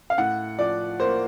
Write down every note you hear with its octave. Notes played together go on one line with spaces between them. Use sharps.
F5
A2 F#5
F3 D5
A#3 C5